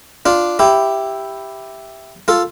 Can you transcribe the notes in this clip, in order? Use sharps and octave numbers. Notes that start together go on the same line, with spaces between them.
D4 F4
E4 G4
F4 A4